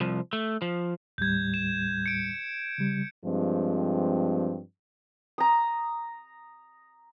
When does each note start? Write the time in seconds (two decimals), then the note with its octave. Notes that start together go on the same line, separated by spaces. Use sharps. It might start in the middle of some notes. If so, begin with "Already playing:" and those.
0.01 C2 F3
0.33 A3
0.62 F3
1.18 D#2 A2 G3 G6 G#6
1.54 E7
2.06 C#7 D7
2.78 C#3 G3
3.25 G2 F3 G#3 C4
5.38 A#5 D#6